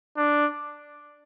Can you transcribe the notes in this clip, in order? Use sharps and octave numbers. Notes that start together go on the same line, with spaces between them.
D4